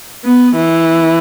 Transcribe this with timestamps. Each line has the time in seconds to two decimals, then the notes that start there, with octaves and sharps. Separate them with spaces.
0.25 B3
0.56 E3